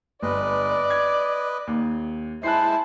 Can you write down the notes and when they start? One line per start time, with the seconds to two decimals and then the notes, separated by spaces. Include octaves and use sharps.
0.22 G1 B4 D5 D#5
0.90 G#6
1.67 D#2
2.43 G#3 E4 C5 A5 F#6 C7